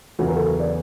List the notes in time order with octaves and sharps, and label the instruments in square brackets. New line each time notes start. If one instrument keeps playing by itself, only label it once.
[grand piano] E2 C#3 F#3 B3 [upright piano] F#4
[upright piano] A#4
A4
A#4
D5